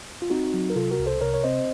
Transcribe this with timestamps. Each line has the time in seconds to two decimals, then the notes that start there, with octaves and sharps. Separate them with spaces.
0.22 F4
0.30 C4 D#4 F#4
0.54 F#3
0.70 A#4
0.76 C3 F4 A4
0.91 F#4 A#4
0.99 C2
1.06 A4 C5
1.21 C3 A#4 C#5
1.34 C#5
1.44 C4 C5 D#5